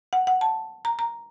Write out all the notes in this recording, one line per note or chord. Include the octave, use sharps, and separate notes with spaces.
F#5
F#5
A5
A#5
A#5